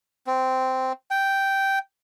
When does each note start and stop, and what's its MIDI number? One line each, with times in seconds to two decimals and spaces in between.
0.27 0.92 60
1.11 1.79 79